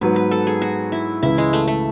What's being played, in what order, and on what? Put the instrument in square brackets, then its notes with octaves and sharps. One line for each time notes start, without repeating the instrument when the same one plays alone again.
[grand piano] G#2 F#3 B3 [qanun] B4
[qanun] B4
A4
G#4
F#4
E4
[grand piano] C#2 C#3 E3 [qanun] E4
[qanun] G#3
A3
A3